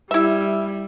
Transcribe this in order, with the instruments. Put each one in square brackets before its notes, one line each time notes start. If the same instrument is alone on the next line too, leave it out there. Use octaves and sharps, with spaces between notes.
[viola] G3 [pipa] E4 E5